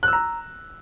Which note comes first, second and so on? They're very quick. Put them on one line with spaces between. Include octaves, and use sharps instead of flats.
F#6 E6 A#5